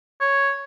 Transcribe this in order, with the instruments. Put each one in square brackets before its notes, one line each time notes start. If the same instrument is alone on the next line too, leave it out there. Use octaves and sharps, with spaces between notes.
[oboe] C#5